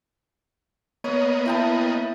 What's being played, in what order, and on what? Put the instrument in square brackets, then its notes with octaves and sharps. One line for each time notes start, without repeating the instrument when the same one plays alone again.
[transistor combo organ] A#3 B3 D#5 [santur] C#5
[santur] E4 G5 A5